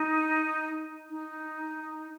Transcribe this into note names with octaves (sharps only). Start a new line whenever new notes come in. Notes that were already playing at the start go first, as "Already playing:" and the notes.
Already playing: D#4
D#4